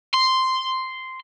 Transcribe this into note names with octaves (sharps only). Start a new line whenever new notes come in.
C6